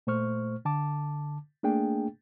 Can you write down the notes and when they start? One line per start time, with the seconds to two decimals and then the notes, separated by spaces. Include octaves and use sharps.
0.07 A#2 A3 C5 C#6 F6
0.65 D3 A5 D6
1.63 A3 A#3 D4 G#4 G5